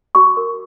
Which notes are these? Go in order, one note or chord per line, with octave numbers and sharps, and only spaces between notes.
F#4 C#6
A#4